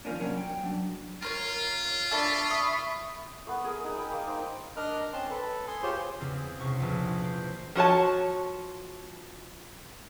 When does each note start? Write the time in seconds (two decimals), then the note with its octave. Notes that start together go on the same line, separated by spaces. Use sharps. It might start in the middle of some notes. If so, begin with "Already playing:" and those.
0.05 D#3 F3 F#3 A#3 C#4 D4
0.20 C2 F#3 C#4 D4
0.37 G5
0.63 F#3 D4
1.22 F4 A#4 C5 C#5
2.11 D4 A4 E5 B5 C#6
2.50 D#6
3.47 A3 B3 B4
3.64 G#4 A#4
3.84 D#4 G#4
3.98 G5 G#5 B5
4.12 A#3
4.27 D#4 C5 G5
4.76 D4 A#4 D#5 A#5 F6 F#6
5.13 C4 C#4 A5 C6
5.30 A4 B4
5.68 G#5 C6 D#6
5.83 F4 G4 G#4 C5 C#5 C6
6.20 E2 C#3 C4
6.60 C#2 C3 C#6
6.80 A#1 E2 E3
7.23 G4 C5
7.75 F3 F#4 C#5 A5